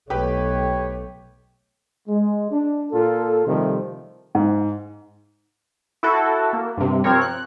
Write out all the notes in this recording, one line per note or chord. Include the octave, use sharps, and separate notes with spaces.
B1 A3 G4 B4 C#5 G5
G#3
D4
A#2 F4 A4
C3 D#3 F3 G3 A3
G#2
E4 F#4 A4
A#3
G2 C3
F3 C4 A#4 C#5
F#6